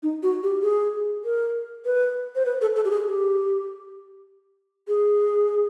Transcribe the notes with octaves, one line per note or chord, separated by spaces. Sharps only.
D#4
F#4
G4
G#4
A#4
B4
C5
B4
A4
A4
G4
G#4
G4
G#4